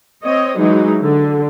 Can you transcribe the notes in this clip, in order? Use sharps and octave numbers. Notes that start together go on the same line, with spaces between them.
C4 C#5 D#5
E3 F#3 G#3 D#4
D3